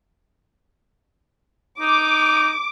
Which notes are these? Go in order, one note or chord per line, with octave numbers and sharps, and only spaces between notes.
D#4 D6